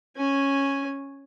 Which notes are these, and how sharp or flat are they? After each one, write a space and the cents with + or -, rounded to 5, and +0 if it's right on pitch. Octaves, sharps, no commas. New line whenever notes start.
C#4 -10 G#5 +0